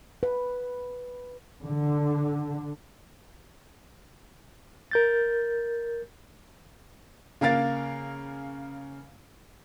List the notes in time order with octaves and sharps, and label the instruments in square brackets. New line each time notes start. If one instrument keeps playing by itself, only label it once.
[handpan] B4
[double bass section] D3
[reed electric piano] A#4 G6 A6
[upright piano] C#3 A#3 A#4 F5 A6